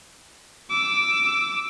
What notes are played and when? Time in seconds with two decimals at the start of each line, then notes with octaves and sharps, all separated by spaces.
0.70 D6 E6